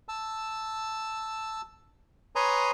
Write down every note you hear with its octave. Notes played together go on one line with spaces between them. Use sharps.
A5 E6
B4 C#5 G#5 A#5 C6 D#6